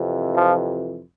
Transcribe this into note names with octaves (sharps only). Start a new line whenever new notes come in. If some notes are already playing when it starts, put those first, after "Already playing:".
Already playing: F2 C3 E3
F3